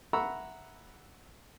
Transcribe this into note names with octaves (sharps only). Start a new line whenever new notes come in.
E5 F#5 A#5 B5 C#6 E6